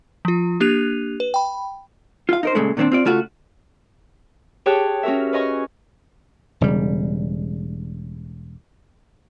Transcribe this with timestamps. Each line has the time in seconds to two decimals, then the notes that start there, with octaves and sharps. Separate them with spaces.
0.25 F3 F4
0.60 A#3 D4 G4 F#6 D#7 F7
1.20 B4
1.34 G5 B5
2.29 F4 F5
2.43 D#4 A#4 C5
2.55 A#2 C#3 G#3 A3
2.77 A#2 D#3 B3 C4 D4
2.92 C4 F4 D5
3.05 C#3 A3 F4 F#4
4.66 G4 G#4 C#5 G5 A5 F#6
5.03 C#4 F#4 A#4 E5
5.33 B4 C#5 D#5 G#5 C#6
6.61 E1 C#3 G3